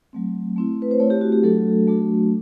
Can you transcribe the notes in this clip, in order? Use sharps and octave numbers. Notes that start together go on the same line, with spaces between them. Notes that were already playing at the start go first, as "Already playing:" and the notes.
F#3 A3 C4
A3 C4 E4
B4
C5
A3 C4 E4 C#5
G4
F#4
G4
F#3 A3 D4 F#4 A4
F#3 A3 D4 F#4